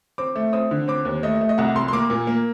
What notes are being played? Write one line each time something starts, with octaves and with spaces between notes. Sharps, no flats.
C4 D6
A3
C4 D#6
D3
C4 D6
D#2
A3 D#5
A3
D#5
C2 F#5
C2 C6
C6
A#3 D6
A#2
A#3